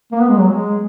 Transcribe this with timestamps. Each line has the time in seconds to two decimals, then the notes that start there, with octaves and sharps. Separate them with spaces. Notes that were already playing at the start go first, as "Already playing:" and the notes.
0.12 A#3
0.20 B3
0.29 G#3
0.39 F#3
0.48 G#3